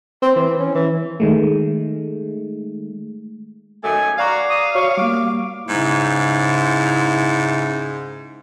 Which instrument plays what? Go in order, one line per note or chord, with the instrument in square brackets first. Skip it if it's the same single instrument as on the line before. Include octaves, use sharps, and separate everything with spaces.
[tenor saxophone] C4
E3
C#4
E3
[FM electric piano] D#3 G#3 A3
[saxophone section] F#2 D#3 A3 [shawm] G#5
[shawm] F#4 [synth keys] D5 A#5 D6 [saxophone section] F5
[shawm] D#6
[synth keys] F#4 C#5 [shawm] C#6
[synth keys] G3 A#3 [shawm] D6
[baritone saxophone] G#2 [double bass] C#3 E4